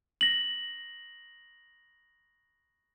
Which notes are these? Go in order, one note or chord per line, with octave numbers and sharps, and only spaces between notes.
A#6 F#7